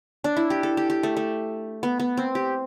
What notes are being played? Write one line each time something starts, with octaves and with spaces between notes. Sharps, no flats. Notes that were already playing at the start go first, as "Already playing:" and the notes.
D4
E4
G4
A4
G4
G4
A3
A3
B3
B3
C4
G4